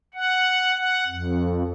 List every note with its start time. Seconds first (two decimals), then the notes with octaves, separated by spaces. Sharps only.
0.14 F#5
0.75 F#5
1.07 F2